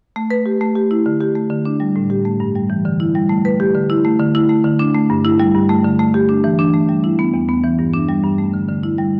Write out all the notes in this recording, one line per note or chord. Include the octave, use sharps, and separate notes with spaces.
A3
B4
G4
A3
G4
E4
D3
G4
A3
D3
D4
G3
A2
G4
A3
G2
G3
E3
D3
E4
G3
A3
B4
G4
D3
E4
A3
D3
E4
A3
D3
D4
A3
G2
E4
G3
G2
A3
D3
A3
G4
D4
E3
D4
A3
G3
E4
B3
E2
B3
E3
G2
D4
G3
G2
A3
D3
D3
E4
G3